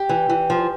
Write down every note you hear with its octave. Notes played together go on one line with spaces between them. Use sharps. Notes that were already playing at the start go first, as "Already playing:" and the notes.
Already playing: G4
E3
E3
F3